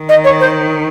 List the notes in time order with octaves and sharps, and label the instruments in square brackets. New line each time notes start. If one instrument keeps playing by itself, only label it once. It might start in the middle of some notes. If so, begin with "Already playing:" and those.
Already playing: [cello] D#3
[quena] D#5
C#5
C5